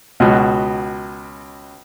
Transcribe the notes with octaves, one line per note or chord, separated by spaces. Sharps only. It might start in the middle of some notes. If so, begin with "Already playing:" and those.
C#2 B2 F#4